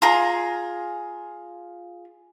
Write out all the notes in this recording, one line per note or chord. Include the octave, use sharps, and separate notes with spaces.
F4 G#4 A#5